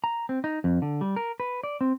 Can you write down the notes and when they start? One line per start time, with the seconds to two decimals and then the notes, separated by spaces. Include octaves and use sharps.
0.04 A#5
0.29 C4
0.44 D#4
0.64 F2
0.82 D3
1.01 G3
1.16 A#4
1.40 B4
1.64 D5
1.81 C4